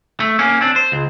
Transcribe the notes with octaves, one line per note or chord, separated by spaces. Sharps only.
A3
A#3 C#4
C4 D4
C5
C#2